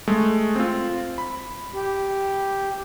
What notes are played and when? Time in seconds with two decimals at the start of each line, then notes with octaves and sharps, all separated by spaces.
0.08 G#3 A3
0.56 C4 F4
1.18 B5
1.74 G4